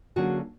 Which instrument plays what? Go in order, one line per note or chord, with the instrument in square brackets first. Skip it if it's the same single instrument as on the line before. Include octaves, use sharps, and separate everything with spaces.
[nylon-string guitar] D3 F#3 A#3 C#4 F#4 G#4